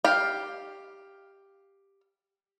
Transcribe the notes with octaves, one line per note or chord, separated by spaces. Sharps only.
G4 F5